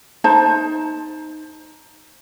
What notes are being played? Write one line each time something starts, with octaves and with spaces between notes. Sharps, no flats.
D#4 C5 A5